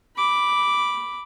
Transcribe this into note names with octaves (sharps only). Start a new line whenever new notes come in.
B5 D6